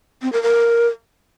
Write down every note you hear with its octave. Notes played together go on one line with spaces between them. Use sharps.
C4
A#4
A#4